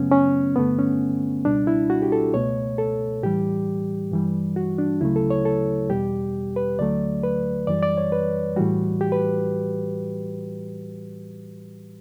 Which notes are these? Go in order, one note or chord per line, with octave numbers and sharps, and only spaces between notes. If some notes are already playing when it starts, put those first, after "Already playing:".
Already playing: F#2 C#3 F#3 A3 B3 C#4
C#4
G2 D3 A3 B3
C#4
C#2 B2 G3 D4
E4
F#4
G4
A4
C#2 B2 A3 C#5
A4
A2 E3 G3 G4
G2 E3 G3
F#4
D4
D2 C#3 F#3 A3 E4
A4
C#5
A4
E2 B2 G3 G4
B4
D2 D3 F#3 A3 D5
B4
F#2 E3 G3 D5
D5
C#5
B4
A2 E3 G3 F#4
G4
B4